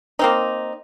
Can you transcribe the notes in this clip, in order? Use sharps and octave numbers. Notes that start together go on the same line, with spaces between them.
A#3 C4 D#4